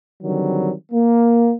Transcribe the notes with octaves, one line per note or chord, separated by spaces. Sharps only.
D3 D#3 F#3 G3 C4
A#3